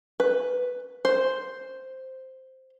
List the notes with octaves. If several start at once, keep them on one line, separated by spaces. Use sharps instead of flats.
B4
C5